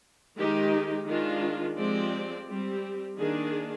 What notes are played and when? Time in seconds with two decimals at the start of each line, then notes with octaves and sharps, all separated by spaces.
0.37 D#3 G#3 D#4 G4
1.06 D#3 G#3 D4 F4
1.76 F3 G#3 C4 G4 D5
2.46 G3 C4 G4
3.17 D#3 A#3 D4 G#4